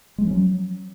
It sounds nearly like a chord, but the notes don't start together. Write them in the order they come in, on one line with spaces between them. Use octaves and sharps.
G#3 F3 C#4 F#3